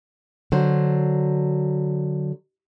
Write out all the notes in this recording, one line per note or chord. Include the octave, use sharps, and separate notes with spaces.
D3 F#3 C5